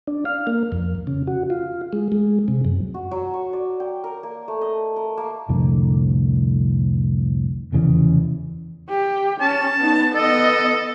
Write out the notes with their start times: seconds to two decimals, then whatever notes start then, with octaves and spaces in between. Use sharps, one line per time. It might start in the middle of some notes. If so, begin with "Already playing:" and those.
0.07 D4
0.25 F5
0.47 A#3
0.72 F2
1.07 C#3
1.27 F#4
1.50 F4
1.93 G#3
2.12 G#3
2.48 C3
2.65 F#2
2.94 F#4
3.11 F#3
3.34 C#6
3.53 D5
3.80 G5
4.04 A#4
4.23 A#3
4.48 A3
4.61 D#5
4.96 A#4
5.17 A#3
5.49 C2 F2 A2 D3
7.72 F1 E2 C#3 E3
8.89 G4
9.41 C#4 A5
9.78 B3 D#4
10.15 B3 A4 D#5